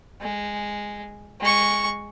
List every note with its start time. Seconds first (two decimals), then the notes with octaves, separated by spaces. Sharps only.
0.21 G#3
1.40 G#3 C#6